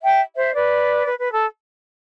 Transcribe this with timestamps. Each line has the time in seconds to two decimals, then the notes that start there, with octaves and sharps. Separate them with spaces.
0.02 E5 G5
0.37 C5 E5
0.53 B4 D5
1.05 B4
1.17 B4
1.31 A4